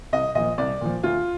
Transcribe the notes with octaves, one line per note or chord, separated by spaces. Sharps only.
C2 D#5
A#2 F3 D#5
C2 D5
A#2 F3
D2 F4